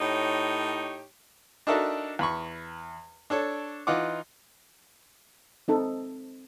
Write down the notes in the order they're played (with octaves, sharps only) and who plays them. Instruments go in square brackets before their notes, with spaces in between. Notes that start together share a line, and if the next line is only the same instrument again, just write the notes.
[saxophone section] A2 D#4 G4 C#5
[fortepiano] D4 D#4 F#4 A4 A#4 E5
E2 B5 C#6
D4 A4 C#5
E3 D#4 F4 F#5 D6
[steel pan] C4 D#4 A4